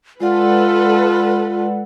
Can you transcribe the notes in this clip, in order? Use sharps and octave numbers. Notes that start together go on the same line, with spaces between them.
G#3 F4 A4 B4 D5 F#5